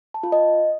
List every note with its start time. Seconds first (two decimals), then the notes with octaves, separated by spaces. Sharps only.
0.14 A5
0.23 F4
0.32 D#5